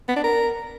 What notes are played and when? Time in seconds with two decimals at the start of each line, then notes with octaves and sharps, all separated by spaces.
0.08 B3
0.16 D4
0.24 A#4